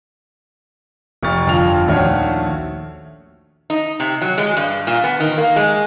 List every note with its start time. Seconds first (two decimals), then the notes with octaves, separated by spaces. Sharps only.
1.23 F1 C#6 F6 A6
1.47 G1 F2 F4 F7
1.87 A#1 D#2 A3 F#4 C#5 F6
3.70 D#4
4.00 C3
4.22 F#3
4.38 G#3
4.57 G2
4.87 A#2
5.04 B3
5.20 D#3
5.38 A#3
5.56 G#3